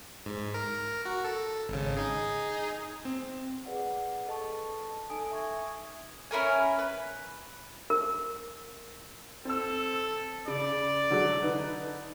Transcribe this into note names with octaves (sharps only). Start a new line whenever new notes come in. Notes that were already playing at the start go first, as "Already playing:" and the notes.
G#2
A#4
F#4
A4
G#1 C#3
D#4 G#4
C4
G#4 B4 D5 F#5
A4 D#5 A5 C#6
D#4 A4 G#5 D#6 D7
E5 G#5 C#6 D#6 G#6
C#4 E4 A#4 G#5
B4
A#4
C4 A4 E6
C#3 D5
D3 F#3 G#3
D3 D#4 B4